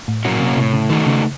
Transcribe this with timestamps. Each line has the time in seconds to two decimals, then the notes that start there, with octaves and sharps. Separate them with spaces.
0.08 A2
0.25 A#2 F#3 A#3 C#4 F#4
0.40 C3
0.57 A2 C3
0.73 C#3
0.90 D#3 A3 D#4 F#4
1.06 C#3